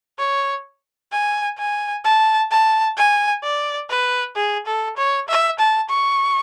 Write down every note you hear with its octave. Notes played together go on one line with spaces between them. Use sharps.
C#5
G#5
G#5
A5
A5
G#5
D5
B4
G#4
A4
C#5
E5
A5
C#6